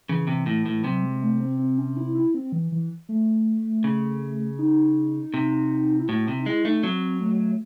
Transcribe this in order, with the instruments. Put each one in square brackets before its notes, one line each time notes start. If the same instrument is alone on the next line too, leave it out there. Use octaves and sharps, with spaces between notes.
[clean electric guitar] C#3 [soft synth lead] E3
[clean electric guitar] C3
A2
A2
[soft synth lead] E3
[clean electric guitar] C3 [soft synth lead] F#3
[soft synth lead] G#3
A3
A3
C4
C4
C#4
E4
E4
C4
E3
E3
A3
[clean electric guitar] C#3
[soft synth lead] D#4
[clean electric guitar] C3
[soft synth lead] E4
[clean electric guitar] A2 [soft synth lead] F#4
[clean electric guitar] C3 [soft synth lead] E4
[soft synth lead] D#4
[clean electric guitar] G#3 [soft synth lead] E4
[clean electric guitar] A3 [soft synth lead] D#4
[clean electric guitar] F#3 [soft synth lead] C4
[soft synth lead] A3